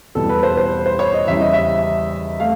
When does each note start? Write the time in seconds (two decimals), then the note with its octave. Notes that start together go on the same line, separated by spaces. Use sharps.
0.15 E2 B2 G3 A4
0.29 B4
0.43 C5
0.57 C5
0.86 C5
0.99 C#5
1.13 D#5
1.27 E2 C#3 E3 G3 E5
1.40 D#5
1.53 E5
2.40 A3 F5